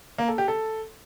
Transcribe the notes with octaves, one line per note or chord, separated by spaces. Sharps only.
A#3
A4
G4
A4